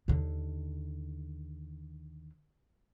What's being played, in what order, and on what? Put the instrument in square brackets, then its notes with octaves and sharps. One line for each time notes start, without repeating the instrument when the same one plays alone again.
[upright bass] D#2 D3